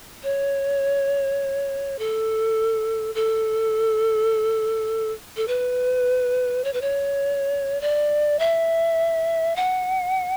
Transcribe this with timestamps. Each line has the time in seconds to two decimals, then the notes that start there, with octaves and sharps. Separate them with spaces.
0.23 C#5
1.99 A4
3.15 A4
5.36 A4
5.48 B4
6.64 C#5
6.73 B4
6.81 C#5
7.81 D5
8.39 E5
9.56 F#5